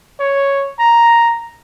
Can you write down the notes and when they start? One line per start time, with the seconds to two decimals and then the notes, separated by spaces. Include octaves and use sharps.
0.20 C#5
0.79 A#5